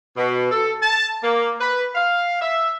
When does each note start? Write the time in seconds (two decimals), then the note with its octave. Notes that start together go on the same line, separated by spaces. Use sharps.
0.17 B2
0.52 A4
0.82 A5
1.24 A#3
1.61 B4
1.95 F5
2.41 E5